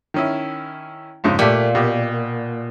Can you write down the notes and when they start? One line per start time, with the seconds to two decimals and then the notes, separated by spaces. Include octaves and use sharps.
0.14 D#3 C#4 E4
1.24 F2 G#2 C#3
1.39 A#2 A3 G4
1.75 B2 G4